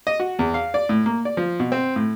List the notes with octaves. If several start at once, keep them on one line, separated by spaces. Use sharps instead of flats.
D#5
F#4
E2
F5
D5
A2
A#3
D5
F3
B2
C4
A2